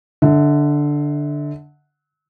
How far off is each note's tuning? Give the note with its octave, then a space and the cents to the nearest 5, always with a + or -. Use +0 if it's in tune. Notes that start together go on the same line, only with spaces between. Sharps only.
D3 +0 E5 -35